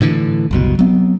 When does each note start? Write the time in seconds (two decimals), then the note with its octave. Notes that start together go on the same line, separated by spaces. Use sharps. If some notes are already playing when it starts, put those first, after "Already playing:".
0.01 A2 D3 E3
0.51 F#1 C2 B2
0.79 F#3 B3 C4